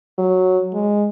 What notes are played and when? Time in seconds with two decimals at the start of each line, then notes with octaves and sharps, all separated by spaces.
0.18 F#3
0.73 G#3